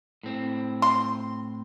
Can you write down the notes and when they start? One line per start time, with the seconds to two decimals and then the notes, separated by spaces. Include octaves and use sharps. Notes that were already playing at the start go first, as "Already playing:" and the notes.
0.23 A2 C4
0.82 C6